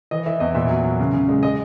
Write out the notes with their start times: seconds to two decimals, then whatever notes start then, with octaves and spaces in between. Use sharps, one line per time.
0.11 E3 D#5
0.26 E3 E5
0.40 E2 D#5
0.55 A#2 E5
0.69 F#3
0.84 F#3
0.99 C#3
1.13 C#3
1.29 G#3
1.43 G#3 D#5